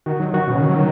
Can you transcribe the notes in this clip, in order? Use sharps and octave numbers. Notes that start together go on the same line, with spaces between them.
D#3 F#4
F#3 D#4
D#3 F#4
B2 C#4
C#3
D#3
F#3
D#3